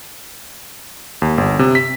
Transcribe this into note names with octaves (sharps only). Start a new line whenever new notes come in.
D#2
G1
C3
B6